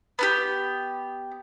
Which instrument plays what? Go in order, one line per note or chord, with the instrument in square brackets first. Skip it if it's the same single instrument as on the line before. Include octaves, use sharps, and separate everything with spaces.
[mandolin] B3 D4 G4